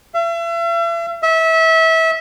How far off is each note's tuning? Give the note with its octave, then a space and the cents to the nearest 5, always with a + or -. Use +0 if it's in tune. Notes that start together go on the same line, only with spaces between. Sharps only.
E5 +40
E5 -25